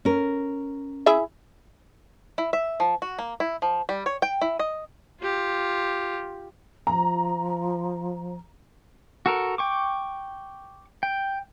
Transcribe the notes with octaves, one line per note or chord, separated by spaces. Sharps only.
C#4 A#4
E4 G#4 E5
E4
E5
F3
F#4
A#3
E4
F3
G3
C#5
G5
E4
D#5
F4 G4
F3 A#5
F#4 A4 A#4
G5 C#6 D6
G5